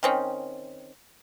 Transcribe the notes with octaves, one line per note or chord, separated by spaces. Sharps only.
D#3 C4 C#4